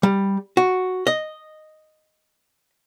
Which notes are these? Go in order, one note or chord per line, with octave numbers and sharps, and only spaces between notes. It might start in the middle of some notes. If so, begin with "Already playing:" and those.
G3
F#4
D#5